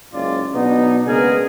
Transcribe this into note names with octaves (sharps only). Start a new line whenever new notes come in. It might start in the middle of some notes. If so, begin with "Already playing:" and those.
F#1 G#2 G#3 C#4 F4 D5
B2 F#3 B3 D4 D#4
C#3 G#3 A#3 B3 G#4 A#4